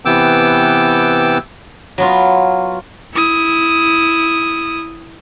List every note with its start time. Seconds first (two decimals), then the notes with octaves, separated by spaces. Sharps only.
0.05 C3 E3 B3 G5 D6 E6
1.98 F#3 B3 F4
3.14 E4 D#6